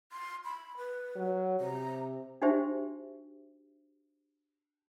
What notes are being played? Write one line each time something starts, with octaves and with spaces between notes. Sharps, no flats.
C6
B5
B4
F#3
C3 A#5
D4 D#4 F#4 G4 C5 E5